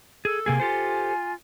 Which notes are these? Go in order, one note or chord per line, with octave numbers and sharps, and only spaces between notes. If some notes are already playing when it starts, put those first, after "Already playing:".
G#4 A4
C3 A#3 G#4 G#5
F4 G4 A4 C5